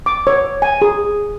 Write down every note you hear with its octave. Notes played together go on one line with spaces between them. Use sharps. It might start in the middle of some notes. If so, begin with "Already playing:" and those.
D6
C#5
G#5
G#4